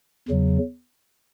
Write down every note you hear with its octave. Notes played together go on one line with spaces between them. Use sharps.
E2 C#3 F#3